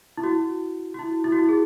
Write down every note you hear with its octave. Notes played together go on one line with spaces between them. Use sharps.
E4
F#4
F#4
E4
E4
F#4
E4
G#4